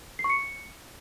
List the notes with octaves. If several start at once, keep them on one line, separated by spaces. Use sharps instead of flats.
C7
C#6
C#7